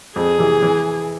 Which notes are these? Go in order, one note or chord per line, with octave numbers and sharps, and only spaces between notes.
F2 G#4
C3 E3
E3